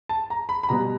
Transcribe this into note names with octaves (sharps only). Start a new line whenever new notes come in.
A5
A#5
B5
B5
B2 G3 B3 A#5